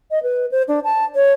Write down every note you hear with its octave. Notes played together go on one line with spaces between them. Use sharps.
D#5
B4
C5
D4
A5
C#5